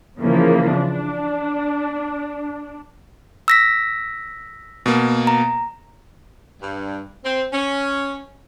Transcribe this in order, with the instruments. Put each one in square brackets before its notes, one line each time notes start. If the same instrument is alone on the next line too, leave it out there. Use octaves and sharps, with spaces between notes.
[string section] C#3 E3 F3 A#3
D4
[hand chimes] E6 A#6 B6
[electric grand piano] B2 A#3
[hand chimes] A#5
[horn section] G2
C4
C#4